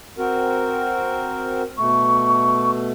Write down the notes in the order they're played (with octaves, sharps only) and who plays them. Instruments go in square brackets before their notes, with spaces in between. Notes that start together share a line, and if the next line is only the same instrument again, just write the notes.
[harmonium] C4 F#4 A#4
[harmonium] B2 A3 [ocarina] C#6